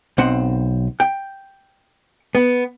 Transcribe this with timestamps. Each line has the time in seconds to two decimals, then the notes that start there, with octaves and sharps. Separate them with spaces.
0.18 B1 C4 C5 F#5
1.00 G5
2.35 B3